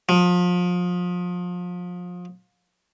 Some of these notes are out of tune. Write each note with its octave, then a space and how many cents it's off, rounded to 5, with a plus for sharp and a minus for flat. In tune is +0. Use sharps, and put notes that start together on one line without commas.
F3 +30